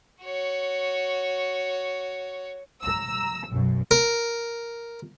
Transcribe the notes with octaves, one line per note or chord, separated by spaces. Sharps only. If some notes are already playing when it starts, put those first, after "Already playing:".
F#4 C#5
A#5 E6
B1 F#2
A#4